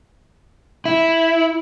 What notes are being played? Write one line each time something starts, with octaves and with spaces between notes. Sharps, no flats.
E4